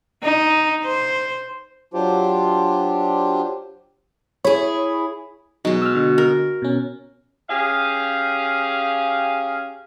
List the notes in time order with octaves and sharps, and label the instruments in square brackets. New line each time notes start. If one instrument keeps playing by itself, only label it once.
[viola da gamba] D#4
C5
[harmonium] F#3 D4 F4 G4 C5
[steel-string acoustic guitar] E4 G#4 [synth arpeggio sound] C#5
[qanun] B2 G#3 [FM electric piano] F#3 D#4
[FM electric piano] E6 F6
D3
[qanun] A#4
[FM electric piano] B2 C#4
[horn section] C#4 G4 G#4 F5